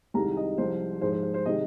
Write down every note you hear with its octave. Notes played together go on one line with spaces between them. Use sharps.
C2 C3 D#3 G#3 A#5
D#5
C2 C3 F3 G#3 C5
G#2 F3 G#3 C5
C5
C5
C5
C3 D#3 G#3 D#5